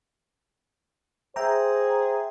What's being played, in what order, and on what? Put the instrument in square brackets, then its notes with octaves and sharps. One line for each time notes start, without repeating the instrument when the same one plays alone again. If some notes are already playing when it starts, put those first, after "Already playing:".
[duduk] G#4 [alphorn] C5 [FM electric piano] E5 G5 A#5